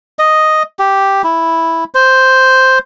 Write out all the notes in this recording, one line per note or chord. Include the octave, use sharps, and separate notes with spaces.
D#5
G4
E4
C5